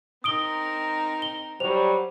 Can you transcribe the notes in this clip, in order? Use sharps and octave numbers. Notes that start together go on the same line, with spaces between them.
C4 D#4 A#4 D#6 D7 G7
G7
F#3 G3 C5 F7